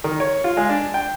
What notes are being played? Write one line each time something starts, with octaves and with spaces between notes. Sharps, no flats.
D#3
C#5
F4
G#3
D4
G5